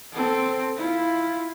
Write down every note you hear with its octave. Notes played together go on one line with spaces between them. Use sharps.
C4 A4
E4 F4